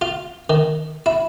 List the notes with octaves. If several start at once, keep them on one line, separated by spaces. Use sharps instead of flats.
F4
D#3
E4